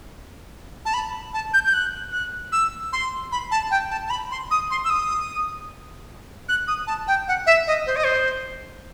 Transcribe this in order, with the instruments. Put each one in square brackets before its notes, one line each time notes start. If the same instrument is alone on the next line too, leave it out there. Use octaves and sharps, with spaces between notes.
[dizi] A5
B5
A5
G6
G6
F#6
F#6
E6
C6
B5
A5
G5
A5
A5
B5
C6
D#6
C6
E6
D#6
F#6
D#6
A5
G5
F#5
E5
D#5
C5
D#5
C5